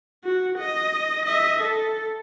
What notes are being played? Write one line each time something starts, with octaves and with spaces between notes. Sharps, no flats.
F#4
D#5
D#5 E5
A4